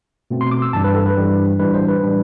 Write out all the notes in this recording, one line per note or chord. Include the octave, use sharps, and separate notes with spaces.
B2 A3 C4
C6
D6
E6
G2 E3 G3 D4 A5
B4
A4
B4
G2 E3 G3 D4
A2 E3 G3 D4 B4
C5
B4
A2 E3 G3 D4